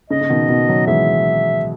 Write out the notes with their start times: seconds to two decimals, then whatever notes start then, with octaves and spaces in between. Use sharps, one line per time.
0.10 C#3 D#5
0.21 C#3
0.30 B2 D#3
0.49 B2 D#3
0.68 D#3 F#3
0.87 E3 G#3 E5